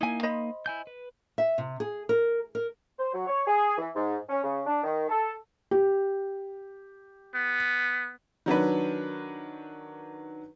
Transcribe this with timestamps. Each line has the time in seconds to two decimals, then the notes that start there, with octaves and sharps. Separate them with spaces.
0.01 A#3 D#4 E4 G#5
0.23 C5 D#5 B5
0.66 E4 G#5 G6
0.87 B4
1.38 E5
1.58 C3
1.80 G#4
2.09 A#4
2.55 A#4
2.99 C5
3.14 F#3
3.27 C#5
3.47 G#4
3.78 E3
3.95 G#2
4.29 C#4
4.43 C#3
4.67 D4
4.84 D#3
5.09 A4
5.71 G4
7.35 B3
8.46 D#3 F#3 D4 B4